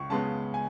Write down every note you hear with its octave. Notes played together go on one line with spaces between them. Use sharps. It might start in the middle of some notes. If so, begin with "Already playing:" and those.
Already playing: C#2 C#6
C#3 G#3 B3 A5
G#5